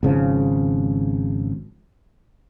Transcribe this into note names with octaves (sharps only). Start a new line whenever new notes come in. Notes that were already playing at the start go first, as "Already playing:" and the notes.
G#1 C#3 F3